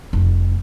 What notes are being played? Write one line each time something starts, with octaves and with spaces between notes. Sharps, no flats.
F1